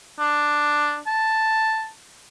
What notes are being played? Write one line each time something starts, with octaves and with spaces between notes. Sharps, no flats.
D4
A5